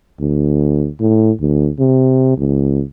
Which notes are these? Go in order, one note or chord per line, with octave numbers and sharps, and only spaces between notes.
D2
A2
D2
C3
C#2